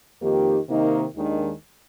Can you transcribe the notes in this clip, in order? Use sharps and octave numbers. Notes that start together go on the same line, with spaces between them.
F2 D#3 A#3 D#4 G4
C3 D#3 A#3 D#4
D#2 D#3 G#3 D4